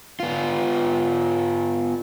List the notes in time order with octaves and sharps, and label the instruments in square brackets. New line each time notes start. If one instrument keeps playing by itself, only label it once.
[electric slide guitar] B3 F4